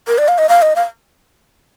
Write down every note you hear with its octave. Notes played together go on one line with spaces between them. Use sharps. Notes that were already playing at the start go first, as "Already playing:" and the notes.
A#4
D5
F5
D#5
F5
D#5
F5